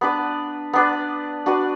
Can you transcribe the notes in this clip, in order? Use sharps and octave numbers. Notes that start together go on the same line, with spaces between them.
B3 D4 B4 D5
B3 D4 B4 D5
D4 F#4 B4 D5